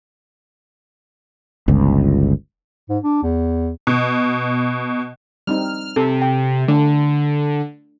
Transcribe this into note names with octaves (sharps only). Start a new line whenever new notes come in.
G1 C#2
G#2
D4
E2
B2
G3 C4 D#4 F6
C3 A4
G5
D3 A3 D4